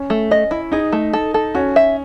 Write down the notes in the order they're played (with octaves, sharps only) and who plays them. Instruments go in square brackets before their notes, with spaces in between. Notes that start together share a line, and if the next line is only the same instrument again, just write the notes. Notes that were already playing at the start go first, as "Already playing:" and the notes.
Already playing: [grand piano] C#4
[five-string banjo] A3
D#5
E4
[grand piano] D#4 [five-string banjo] G#4
[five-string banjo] A3
A4
A4
[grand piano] C#4 [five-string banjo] F#4
[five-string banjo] E5